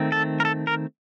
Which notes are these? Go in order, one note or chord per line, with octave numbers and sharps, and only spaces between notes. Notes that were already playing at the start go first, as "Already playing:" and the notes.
Already playing: D#3 A3 C4
A4
A#4
A4
A#4